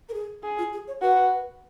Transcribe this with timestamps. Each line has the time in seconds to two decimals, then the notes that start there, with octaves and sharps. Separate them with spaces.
0.09 A#4
0.14 G#4
0.43 G#4
0.58 F4
0.73 G#4
0.87 C#5
1.02 F#4 B4